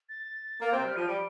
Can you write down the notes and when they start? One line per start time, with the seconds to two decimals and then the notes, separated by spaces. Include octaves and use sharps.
0.09 A6
0.61 A#3 A6
0.72 C3 C4 G6
0.84 G3 F6
0.96 F3 D#7
1.08 G3 D7